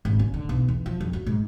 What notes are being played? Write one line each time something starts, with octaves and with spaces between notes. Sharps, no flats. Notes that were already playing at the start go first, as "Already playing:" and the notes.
G#1
C#4
D3
B1
E2
F3
F2
F#3
G#2